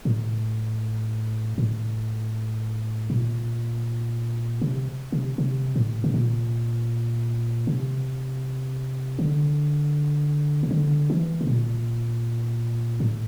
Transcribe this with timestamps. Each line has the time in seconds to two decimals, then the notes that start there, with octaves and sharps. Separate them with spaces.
0.05 A2
1.58 A2
3.10 A#2
4.62 C3
5.12 C3
5.38 C3
5.76 A2
6.04 C3
6.14 A#2
7.67 C3
9.19 D3
10.63 C3
10.71 D3
11.10 E3
11.41 C3
11.47 A#2
13.00 A2